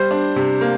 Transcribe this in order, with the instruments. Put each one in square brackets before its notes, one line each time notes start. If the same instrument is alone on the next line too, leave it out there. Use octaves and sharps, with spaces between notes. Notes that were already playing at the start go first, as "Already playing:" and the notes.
Already playing: [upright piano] G3 C5
D4
C3
A#3